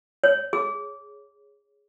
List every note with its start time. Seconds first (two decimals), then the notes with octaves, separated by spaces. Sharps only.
0.24 C#5
0.53 G#4